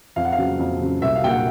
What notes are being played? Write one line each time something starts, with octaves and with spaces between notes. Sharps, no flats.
F2 F5
F#5
F5
C#3 F#3
F2
C#3 F#3
C2 E5
F5
A#2 F#3 A#3 G5
F#5